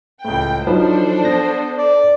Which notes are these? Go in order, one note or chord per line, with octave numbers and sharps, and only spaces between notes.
C#2 A2 G5
F3 F#3 D4 D#4 A4 B4 C5
B3 A#6
D5